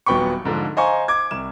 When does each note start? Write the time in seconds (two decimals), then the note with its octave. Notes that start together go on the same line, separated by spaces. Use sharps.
0.06 D#1 F#3 B3 G5 B5 C#6
0.45 G#2 D3 F3
0.77 C5 D#5 F5 G#5 A#5 C#6
1.08 D6 G#6
1.31 C2 E7